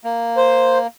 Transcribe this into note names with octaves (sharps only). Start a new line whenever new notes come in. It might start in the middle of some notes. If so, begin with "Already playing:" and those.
A#3
C5